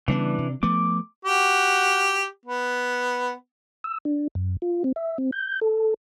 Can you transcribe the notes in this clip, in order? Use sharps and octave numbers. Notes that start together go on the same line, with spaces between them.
C#3 E3 G3 B3 D4
C3
F3 A3 B3 D6
F#4 G4
B3
E6
D4
F#2
F4
C4
E5
C4
G6
A4